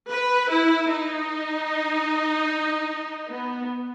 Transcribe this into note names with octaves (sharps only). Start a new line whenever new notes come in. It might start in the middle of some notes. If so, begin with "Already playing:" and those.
B4
E4
D#4
B3